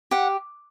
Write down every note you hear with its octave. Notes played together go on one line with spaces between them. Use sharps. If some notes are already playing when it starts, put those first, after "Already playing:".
G4 F#5